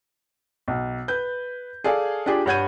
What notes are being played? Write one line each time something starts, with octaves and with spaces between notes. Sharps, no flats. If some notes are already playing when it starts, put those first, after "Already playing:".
B1
B4 G6
G#4 A4 D5 F5 G#5
D4 F4 G4 G#4 D5
G2 C#5 F#5 G6 G#6 D#7